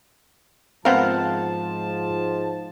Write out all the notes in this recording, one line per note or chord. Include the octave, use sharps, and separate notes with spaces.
G#2 F3 B3 C4 A#4 F5 F#5 A5